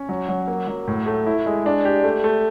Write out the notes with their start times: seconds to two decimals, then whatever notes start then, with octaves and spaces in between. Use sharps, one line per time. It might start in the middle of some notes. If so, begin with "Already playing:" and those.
Already playing: C#4
0.09 F#3
0.28 F#3
0.48 A#3
0.68 F#3
0.88 A2
1.06 A3
1.27 E4
1.46 G#3
1.66 D4
1.85 G4
2.04 A3
2.24 A3